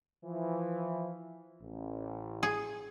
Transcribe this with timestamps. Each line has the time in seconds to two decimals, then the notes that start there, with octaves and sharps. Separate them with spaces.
0.24 E3 F3
1.62 A1
2.43 G#4